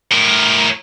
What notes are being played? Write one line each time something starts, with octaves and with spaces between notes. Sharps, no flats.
A2 A#4